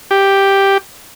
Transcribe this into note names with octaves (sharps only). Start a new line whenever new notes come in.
G4